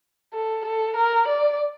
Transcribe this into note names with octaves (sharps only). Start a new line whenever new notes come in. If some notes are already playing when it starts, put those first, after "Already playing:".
A4
A4
A#4
D5